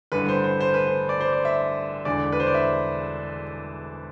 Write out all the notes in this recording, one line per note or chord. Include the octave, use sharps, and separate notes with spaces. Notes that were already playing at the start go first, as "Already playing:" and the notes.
A1 G2 D3 B4
C5
C5
C5
B4
C5
D5
C5
D5
E5
E1 E2 D3 D5
B4
C5
D5
E5